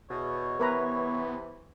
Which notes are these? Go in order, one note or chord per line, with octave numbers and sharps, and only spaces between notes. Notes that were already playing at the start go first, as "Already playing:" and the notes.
E2 B2 C#5
C3 E3 B3 A#4 B4 A#5